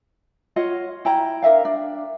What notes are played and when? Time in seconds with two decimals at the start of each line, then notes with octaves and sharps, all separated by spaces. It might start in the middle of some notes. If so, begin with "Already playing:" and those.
0.56 F4 C#5 D#5 F#5
1.05 E4 G5 A#5
1.42 D4 A#4 E5 F5
1.65 D4